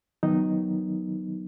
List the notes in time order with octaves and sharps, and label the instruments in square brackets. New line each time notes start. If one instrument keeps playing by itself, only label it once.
[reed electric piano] D#3 F#3 B3 D#4